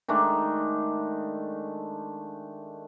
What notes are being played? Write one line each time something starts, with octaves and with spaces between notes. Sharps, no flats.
D#3 G#3 A3 D4